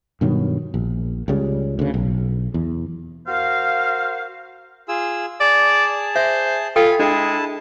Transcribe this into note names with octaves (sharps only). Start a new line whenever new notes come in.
G2 B2 D#3 F#3
A#1
C#2 C#3 G3
D2 C#3
B1
E2
F#4 A#4 C5 F5
F4 G#4 E6
G#4 D5 A5
C5 E5
F4 A4 G5 G#5 B5
G#3 D4 E4 A5